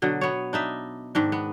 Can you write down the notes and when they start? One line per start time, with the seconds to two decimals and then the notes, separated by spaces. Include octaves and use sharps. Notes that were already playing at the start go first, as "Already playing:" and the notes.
0.02 B2 D3 F#3
0.21 B3 C#5
0.53 D4 D#4 E5
1.15 G#2 D#3 D4
1.32 B3